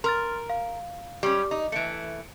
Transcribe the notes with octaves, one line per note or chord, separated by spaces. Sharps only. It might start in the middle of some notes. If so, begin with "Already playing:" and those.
A#4 C6 F6 A6
F5
G3 C#4 G4
D#4
E3 A3 C#7 D7